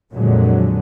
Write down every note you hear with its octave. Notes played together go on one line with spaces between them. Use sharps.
F2 A#2 D3 F#3 G#3